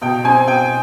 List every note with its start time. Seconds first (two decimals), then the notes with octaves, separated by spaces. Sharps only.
0.01 B2 G5
0.24 C4 G#5
0.47 B2 G5